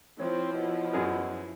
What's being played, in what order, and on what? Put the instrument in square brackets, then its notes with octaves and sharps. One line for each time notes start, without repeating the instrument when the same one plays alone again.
[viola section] F3 E4 F4 [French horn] C4 [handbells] C#5
[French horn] B2
[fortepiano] F#2 G#4 A#4